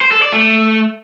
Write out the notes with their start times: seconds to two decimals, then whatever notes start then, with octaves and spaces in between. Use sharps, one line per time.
0.01 C5
0.12 A4
0.22 D5
0.33 A3